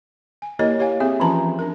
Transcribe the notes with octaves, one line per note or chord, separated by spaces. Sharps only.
G#5
A#3 E4 G4 A#4 C#5 D#5
G4 C#5 F5 G#5
C4 G4 G#4 E5
E3 F3 C#4 F4 A5 A#5
D4 A#4